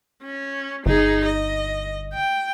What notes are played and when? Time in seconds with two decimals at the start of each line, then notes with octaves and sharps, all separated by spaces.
0.23 C#4
0.86 G1 D#4 G#4
1.25 D#5
2.14 G5